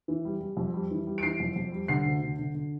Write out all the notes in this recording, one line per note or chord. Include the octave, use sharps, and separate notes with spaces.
E3
G3
G3
F2
G3
E3
G3
D7
E3 C7
F2
F2
G3
D3 C7
D2
D3
D3
D3